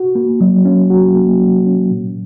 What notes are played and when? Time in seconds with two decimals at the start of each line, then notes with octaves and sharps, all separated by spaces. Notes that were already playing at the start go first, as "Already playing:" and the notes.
Already playing: F#4
0.15 A#3
0.41 F#3
0.65 C#4
0.90 F#4
1.16 A#3
1.41 F#3
1.66 C#4
1.91 A#2